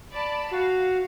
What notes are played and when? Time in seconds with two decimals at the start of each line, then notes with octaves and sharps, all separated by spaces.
0.13 D5 A5 B5
0.51 F#4 F5